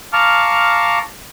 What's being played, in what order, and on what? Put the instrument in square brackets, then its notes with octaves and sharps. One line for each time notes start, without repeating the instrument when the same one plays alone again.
[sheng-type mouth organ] F5 A5 A#5 C#6 D6 F6